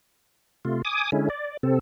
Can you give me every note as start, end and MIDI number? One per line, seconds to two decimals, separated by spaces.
0.65 0.82 48
0.65 0.82 57
0.65 0.82 65
0.85 1.10 80
0.85 1.10 86
0.85 1.10 87
1.12 1.29 50
1.12 1.29 56
1.12 1.29 61
1.12 1.29 64
1.30 1.57 74
1.63 1.79 48
1.63 1.79 60
1.63 1.79 69